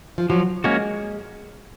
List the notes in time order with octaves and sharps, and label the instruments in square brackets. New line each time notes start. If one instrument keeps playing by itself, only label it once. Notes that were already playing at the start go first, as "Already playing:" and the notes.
[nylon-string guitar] F3
[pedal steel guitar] F3 [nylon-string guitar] F#3
[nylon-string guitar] G#3 [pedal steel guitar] A#3 C#4 F#4